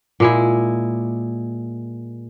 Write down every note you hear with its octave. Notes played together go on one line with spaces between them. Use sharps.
A#2 G#3 E4